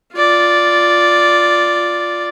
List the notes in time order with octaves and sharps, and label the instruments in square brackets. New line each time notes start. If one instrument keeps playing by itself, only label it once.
[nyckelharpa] F4 D5